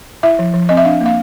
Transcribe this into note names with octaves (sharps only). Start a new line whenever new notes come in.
E4 E5
F3
F3
C4 D#5
E5
D4 F5
A#3 F5